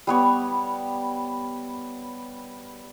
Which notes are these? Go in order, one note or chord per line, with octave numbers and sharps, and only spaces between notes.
G3 B3 C#5